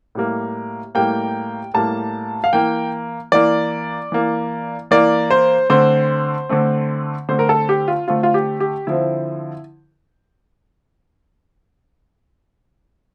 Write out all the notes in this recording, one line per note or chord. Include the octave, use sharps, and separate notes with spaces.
A2 G3 A#3
A2 G3 A#3 G5
A2 G3 A#3 A5
F5
E3 A#3 G5
E3 A#3 D5
E3 A#3
E3 A#3 D5
C5
D3 A3 C4 C5
D3 A3 C4
D3 A3 C4 C5
A#4
A4
G4
F4
D3 A3 C4 F4
F4
G4
G4
D3 F3 C4 E4